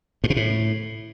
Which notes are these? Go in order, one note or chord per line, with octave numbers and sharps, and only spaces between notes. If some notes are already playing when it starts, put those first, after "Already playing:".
G2
B2
A2